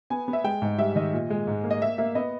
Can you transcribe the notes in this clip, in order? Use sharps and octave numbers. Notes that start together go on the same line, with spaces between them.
B3 G#5
B3
E5
G#3 G5
G#2
G3 E5
D#3 D#5
A#2
G#3
G#2
A#3
D#5
A#3 E5
A#3 E5
B3 D#5